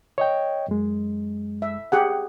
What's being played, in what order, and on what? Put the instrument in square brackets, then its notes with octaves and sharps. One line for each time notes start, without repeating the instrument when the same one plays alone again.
[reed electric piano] C#5 D#5 G5
F#2 G#3
[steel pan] E5
G4 G#4 F#5